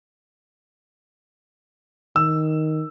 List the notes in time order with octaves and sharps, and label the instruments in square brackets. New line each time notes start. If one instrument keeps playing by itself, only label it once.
[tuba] D#3 [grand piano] E6